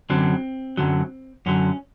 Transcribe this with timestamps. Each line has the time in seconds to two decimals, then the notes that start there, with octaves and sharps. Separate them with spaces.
0.10 F#2 D3 F#3 C4
0.77 F#2 D3 F#3
1.46 F#2 D3 F#3 C#4